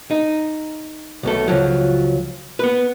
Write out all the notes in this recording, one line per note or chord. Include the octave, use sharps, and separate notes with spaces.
D#4
B1 B2 A3
C#2 F3 F#3
B3 B4